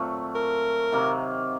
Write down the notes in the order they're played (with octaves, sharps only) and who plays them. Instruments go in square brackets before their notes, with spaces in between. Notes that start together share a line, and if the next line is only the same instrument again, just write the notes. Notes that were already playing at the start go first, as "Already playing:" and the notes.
Already playing: [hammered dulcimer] A#2 F#3 A3 C4
[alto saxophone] A#4
[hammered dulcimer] C3 D#3 F#3 A#3